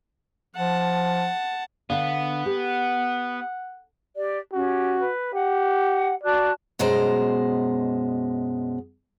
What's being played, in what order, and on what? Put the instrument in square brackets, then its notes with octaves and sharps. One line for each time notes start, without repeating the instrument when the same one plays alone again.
[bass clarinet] F3 [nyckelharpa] F#5 A5
[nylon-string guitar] D3 F5 [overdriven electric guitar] B3
[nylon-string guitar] G4 [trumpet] F#5
[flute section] G4 D5
[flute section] C#4 G4 [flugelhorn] F#4
[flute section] B4
[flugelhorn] G4 [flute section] F#5
[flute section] F#4 A5 F#6 [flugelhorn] D5
[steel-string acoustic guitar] F#2 B2 G#3 C5 A#5